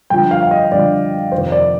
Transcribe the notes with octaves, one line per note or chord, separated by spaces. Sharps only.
G2 D3 F3 G5
F5
F5
D#5
G2 D3 F3 D5
F1 F2 D#3 C5
D5